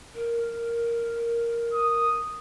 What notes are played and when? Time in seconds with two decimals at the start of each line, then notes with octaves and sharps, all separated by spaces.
0.14 A#4
1.73 D#6